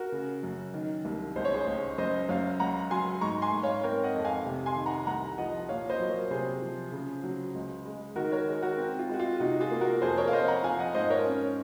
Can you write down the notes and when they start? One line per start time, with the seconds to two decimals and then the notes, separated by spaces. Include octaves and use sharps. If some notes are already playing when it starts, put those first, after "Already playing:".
Already playing: F#4 A#4
0.12 C#3
0.43 F#2
0.74 D#3
1.05 C2
1.36 C#2 C5
1.45 C#5
1.54 G#4 C5
1.67 C#2
1.98 F#2 C5 D#5
2.29 F#2 C#5 F5
2.60 C#2 F#5 A#5
2.90 F#3 G#5 C6
3.21 G#2 A#5 C#6
3.42 G#5 C6
3.53 G#2
3.63 C#5 F5
3.83 C4 A#4 C#5
4.03 D#5 F#5
4.15 F2
4.25 F5 G#5
4.45 C3
4.66 G#5 C6
4.76 D#3
4.86 F#5 A#5
5.07 C2 F#5 A#5
5.38 F3 D#5 F#5
5.69 A#2 C#5 F5
5.89 C5 D#5
6.00 F#3
6.10 A#4 C#5
6.31 C3 G#4 C5
6.62 F3
6.92 C#3
7.24 F#3
7.54 C#2
7.85 G#3
8.16 D#3 F#4 A#4
8.32 A#4 C#5
8.48 G#3
8.62 F#4 A#4
8.78 C4
8.99 F4
9.09 G#3 F#4
9.19 F4
9.40 C3 D#4 F#4
9.60 F4 G#4
9.71 A#3
9.81 F#4 A#4
10.02 F2 G#4 C5
10.17 A#4 C#5
10.28 F5
10.33 F2 C5 D#5
10.48 F#5 A#5
10.63 F3 F5 G#5
10.79 D#5 F#5
10.94 G#2 C5 D#5
11.10 A#4 C#5
11.25 C#4